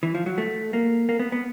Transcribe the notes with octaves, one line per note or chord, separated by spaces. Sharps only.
E3
F3
F#3
A3
A#3
A#3
B3
B3